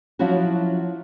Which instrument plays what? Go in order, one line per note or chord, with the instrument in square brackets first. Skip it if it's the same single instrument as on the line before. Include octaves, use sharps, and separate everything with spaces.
[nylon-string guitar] F3 F#3 C#4 E4 F#4